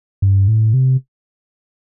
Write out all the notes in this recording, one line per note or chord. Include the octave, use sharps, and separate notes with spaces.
G2
A2
C3